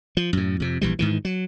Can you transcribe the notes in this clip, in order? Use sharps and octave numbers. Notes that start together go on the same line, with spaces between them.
F3
F#2 A2
F2 C3
A#1 E3 G3
G#2 D#3 E3
F#3